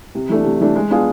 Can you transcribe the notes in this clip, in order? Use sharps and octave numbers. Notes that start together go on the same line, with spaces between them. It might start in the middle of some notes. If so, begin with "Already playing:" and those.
C3
E3 A3 D4
C3
E3 A3 D4
G#3
B3 D4 F4 G#4